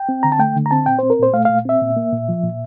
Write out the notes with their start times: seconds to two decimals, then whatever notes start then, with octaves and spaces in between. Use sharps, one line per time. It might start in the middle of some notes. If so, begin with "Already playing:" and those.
Already playing: G5
0.09 C4
0.23 D3 A#5
0.32 A5
0.39 A3 G5
0.56 D3
0.66 A#5
0.71 C4 A5
0.86 A#2 G5
0.99 C4 C5
1.10 A#4
1.19 A#2 C5
1.33 A3 F5
1.45 A#2 F5
1.65 C4 E5
1.82 A#2
1.96 A#3
2.13 A#2
2.29 F3
2.44 A#2